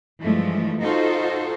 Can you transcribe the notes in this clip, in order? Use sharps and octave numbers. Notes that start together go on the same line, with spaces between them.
G2 E3 F3 G#3 A3
D#4 F4 F#4 A4 C5